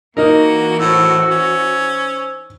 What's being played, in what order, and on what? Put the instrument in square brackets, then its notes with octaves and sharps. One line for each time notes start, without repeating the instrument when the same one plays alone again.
[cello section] E3 F#4 [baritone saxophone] A#3 [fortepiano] D#4 A#4
[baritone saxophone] A2 [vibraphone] C5 E6
[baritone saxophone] C#4